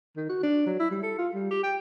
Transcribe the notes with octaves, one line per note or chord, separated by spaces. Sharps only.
D#3
F#4
D4
F#3
E4
G3
A4
F4
G3
G4
G5